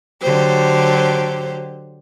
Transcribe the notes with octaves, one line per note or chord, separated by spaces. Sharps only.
D3 F#3 G4 C5